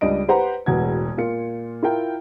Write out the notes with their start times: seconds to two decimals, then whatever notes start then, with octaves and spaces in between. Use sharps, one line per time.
0.01 C#2 G3 D4 D#5 D7
0.28 G4 B4 C5 F#5 A#5
0.66 E1 A1 B2 F#4 G#4 G#6
1.17 A#2 F4 C#7
1.83 E4 F4 A#4 G5